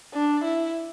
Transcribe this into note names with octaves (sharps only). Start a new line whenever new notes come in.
D4
E4